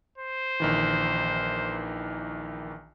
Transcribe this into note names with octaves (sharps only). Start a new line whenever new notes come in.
C5
A#1 D#3 E3